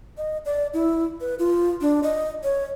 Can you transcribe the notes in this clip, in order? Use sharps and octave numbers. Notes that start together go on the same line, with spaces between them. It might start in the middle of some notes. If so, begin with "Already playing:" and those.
D#5
D5
E4
B4
F4
D4
D#5
C#5